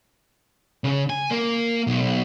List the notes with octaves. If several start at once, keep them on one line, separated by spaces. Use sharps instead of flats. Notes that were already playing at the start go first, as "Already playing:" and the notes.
C#3
G#5
A#3
B1